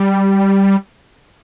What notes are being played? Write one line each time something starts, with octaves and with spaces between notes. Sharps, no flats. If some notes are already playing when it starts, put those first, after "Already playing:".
Already playing: G3